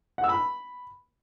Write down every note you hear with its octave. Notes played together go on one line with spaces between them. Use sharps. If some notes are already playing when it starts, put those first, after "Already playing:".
F#5
E6
B5